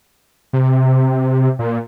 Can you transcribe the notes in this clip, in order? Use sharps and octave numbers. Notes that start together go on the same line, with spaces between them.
C3
A#2